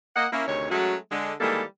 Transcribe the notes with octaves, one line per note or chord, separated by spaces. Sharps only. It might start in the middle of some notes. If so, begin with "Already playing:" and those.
A#3 D#5 F#5
A#3 C#4 E4
D2 C3 D#3 C#5
F#3 G#3 A3 C#4 F#4
D3 G#3
D#3 E3 G3 G#3 A#3 A4